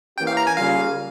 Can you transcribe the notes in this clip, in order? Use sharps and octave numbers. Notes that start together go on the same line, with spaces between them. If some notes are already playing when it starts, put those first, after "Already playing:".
E3 A#3 C#4 G4 G5
F5
A#5
G#5
C#3 G3 A#3 F4 F5